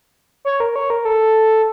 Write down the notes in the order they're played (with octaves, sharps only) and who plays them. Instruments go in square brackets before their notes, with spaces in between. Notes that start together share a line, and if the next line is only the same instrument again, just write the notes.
[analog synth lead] C#5
A#4
C#5
A#4
A4